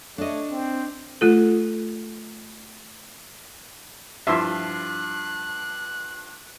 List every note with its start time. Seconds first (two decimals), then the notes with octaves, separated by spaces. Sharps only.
0.18 A3 D4 C#5 D#5
0.50 C4
1.21 A3 F4 A4
4.27 G2 F3 E4 E5 C6 F#6